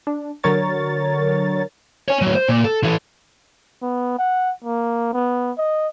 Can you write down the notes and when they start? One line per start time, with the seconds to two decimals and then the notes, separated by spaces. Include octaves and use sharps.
0.07 D4
0.43 D3 F#3 A#4 C#5 A6
2.08 C#5 G#5
2.22 A2 F#3
2.35 C5
2.48 A#2
2.64 A4
2.84 E3 A4
3.82 B3
4.19 F#5
4.65 A#3
5.13 B3
5.58 D#5